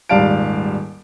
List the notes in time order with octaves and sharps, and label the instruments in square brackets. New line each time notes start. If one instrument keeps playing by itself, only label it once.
[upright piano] D#1 G#2 G3 F5 A5 D7